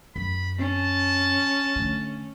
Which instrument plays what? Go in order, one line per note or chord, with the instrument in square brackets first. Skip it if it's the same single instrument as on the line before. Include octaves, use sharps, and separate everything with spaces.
[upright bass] F#2 [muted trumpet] B5
[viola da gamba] C#4 [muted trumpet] A5
[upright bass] D3 A3